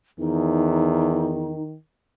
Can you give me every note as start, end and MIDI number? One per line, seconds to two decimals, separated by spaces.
0.20 1.61 40
0.20 1.74 51
0.20 1.63 63